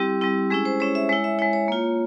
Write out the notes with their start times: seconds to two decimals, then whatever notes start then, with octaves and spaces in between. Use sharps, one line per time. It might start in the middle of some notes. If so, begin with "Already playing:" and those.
Already playing: G3 C4 E4 G4
0.21 G3 C4 E4
0.50 G#3 C#4 E4 G#4
0.65 C5
0.80 G#3 C#4 E4 C#5
0.95 E5
1.09 G#3 E4 C#5
1.24 E5
1.39 G#3 E4 C#5
1.53 C#5
1.68 A#3 F4